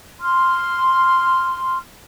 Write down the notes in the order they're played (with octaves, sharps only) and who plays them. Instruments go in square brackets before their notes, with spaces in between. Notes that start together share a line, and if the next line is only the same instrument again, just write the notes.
[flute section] C6 F6